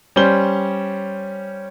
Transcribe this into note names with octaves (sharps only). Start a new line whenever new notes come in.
G3 C#4 C5 G7